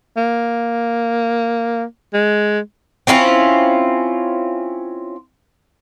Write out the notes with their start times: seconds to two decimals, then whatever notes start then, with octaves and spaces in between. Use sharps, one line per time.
0.17 A#3
2.14 G#3
3.07 C4 C#4 E4 F4